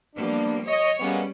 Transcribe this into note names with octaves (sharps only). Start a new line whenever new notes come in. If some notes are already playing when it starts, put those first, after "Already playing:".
F3 G3 A#3 B3 D4
C#5 D#5
G3 G#3 A#3 B3 C#4